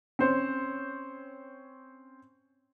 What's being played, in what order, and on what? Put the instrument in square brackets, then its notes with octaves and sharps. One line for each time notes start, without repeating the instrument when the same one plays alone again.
[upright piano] C4 C#4 C5 C#5